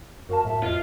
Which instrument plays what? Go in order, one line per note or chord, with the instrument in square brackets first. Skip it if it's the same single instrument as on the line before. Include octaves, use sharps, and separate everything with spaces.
[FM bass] F#2 [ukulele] F#4 F5 A5 [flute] A#4
[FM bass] A2 [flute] E5
[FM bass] F2 [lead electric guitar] F4 [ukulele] D#5